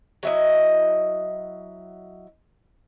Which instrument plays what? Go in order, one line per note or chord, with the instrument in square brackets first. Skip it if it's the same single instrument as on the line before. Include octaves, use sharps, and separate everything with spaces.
[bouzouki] F#3 E4 D#5